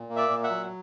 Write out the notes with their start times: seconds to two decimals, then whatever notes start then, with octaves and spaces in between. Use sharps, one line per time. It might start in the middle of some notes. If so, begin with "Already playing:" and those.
Already playing: A#2
0.09 A#3
0.16 D5 E5
0.30 A#2
0.43 E5 F#5
0.50 F#3